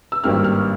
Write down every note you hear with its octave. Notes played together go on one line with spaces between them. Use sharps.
E6
G#1 G2 G3 A#3 F6
F6